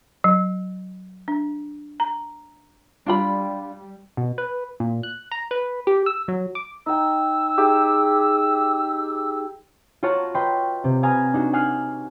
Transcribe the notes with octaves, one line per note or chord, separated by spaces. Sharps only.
F#3
D4
A#5
G3 D4 F4 B5
B2
B4
A#2
F#6
A#5
B4
G4
E6
F#3
D6
D#4 G5 E6
D#4 G4 G#4
F4 F#4 C#5 F#5 A5 A#5
B4 D#5 G5 B5 C6
C3
B4 F5 G#5 A#5 D#6 G#6
D4 D#4 F#4
F#5 G#5 D#6 F6 F#6 C7